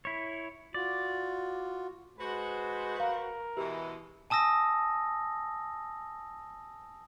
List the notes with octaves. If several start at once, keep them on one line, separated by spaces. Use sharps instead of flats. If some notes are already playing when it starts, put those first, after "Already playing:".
E4 C#5
F4 F#4 D5
G#3 F#4 B4 C5
A#4 F5
B2 E3 G#3 G4
G#5 A5 D#6 E6 A#6